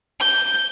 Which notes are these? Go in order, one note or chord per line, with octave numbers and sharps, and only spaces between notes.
G6